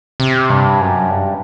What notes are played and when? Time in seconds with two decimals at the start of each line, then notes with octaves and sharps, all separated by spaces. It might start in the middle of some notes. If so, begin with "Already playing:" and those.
0.20 C3
0.50 G2
0.81 F#2
1.10 G2